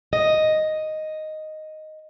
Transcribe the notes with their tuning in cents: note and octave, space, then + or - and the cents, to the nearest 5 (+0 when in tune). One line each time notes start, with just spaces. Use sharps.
D#5 +0